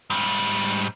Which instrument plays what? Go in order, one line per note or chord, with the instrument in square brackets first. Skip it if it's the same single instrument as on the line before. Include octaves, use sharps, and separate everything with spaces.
[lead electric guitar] G#2 G3